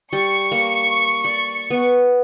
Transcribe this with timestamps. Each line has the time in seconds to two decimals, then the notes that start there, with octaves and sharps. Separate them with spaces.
0.13 G3 C#6 C#7
0.52 A#3
1.25 D5
1.71 B3